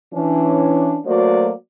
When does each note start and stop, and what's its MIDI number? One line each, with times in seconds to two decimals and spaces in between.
0.13 0.99 52
0.13 0.99 61
0.13 0.99 62
1.06 1.53 54
1.06 1.53 57
1.06 1.53 58
1.06 1.53 66
1.06 1.53 72
1.06 1.53 74